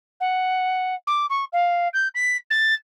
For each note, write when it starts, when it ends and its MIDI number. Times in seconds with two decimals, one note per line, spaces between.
0.20 0.94 78
1.07 1.26 86
1.30 1.45 85
1.53 1.88 77
1.93 2.08 91
2.14 2.37 95
2.50 2.74 93